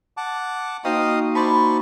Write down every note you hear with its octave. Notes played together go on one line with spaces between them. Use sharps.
F#5 A5 D6
A#3 D#4 F#4 C5 D#5 F5 G5 D#6
E4 C5 D5 A5 B5 C#6